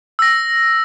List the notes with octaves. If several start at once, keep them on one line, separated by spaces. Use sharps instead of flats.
E6 A#6